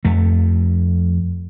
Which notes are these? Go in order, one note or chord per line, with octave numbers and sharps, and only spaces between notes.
F2 A3